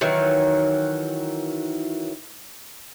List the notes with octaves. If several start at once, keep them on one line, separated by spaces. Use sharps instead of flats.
D#3 E3 F#3